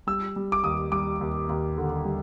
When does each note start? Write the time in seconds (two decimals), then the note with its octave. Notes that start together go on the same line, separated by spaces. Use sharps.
0.07 G3 E6
0.36 G3
0.52 D6
0.64 D#2 D#6
0.92 G3 D6
1.21 D#2
1.49 D#2
1.78 D3
2.05 G3